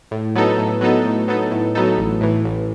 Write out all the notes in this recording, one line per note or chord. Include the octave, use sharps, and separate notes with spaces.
A2
F#3 B3 D#4 A4
A2
F#3 B3 D#4 A4
A2
F#3 B3 D#4 A4
A2
F#3 B3 D#4 A4
A1
A2 E3
A1